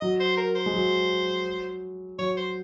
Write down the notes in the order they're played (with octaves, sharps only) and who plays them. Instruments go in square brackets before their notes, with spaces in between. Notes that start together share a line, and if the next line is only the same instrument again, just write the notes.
[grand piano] F#3 [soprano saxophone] D#5
[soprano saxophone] C5
A#4
C5
[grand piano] G#3
F#3
[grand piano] F#3 [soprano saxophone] C#5
[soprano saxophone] C5